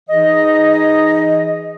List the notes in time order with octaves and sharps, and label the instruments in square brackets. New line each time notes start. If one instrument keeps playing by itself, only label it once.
[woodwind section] E3 D#4 G#4 D#5